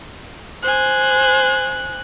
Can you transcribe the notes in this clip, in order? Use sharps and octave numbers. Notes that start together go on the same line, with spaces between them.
C5 G#5 F#6